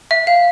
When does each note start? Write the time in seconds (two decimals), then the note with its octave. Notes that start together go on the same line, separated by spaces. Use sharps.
0.11 E5
0.27 F5